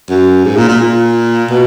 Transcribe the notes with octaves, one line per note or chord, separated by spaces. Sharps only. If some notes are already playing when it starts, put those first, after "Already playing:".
F#2
G#2
A#2
A#2
A#2
B2